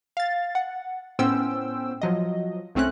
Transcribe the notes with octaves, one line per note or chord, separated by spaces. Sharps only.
F5 A6
F#5
A2 B3 C#4 C5 G5 E6
F3 F#3 D#5
C2 A3 C4 C#4 F#6